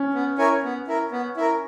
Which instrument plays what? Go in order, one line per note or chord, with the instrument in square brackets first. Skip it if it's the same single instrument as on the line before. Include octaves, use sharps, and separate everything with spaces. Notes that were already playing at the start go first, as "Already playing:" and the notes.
Already playing: [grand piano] C#4
[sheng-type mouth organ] B3
E4 A#4 C#5 G#5
B3
E4 A#4
B3
E4 A#4